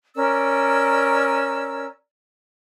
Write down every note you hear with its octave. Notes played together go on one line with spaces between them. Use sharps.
C#4 A#4 D5 E6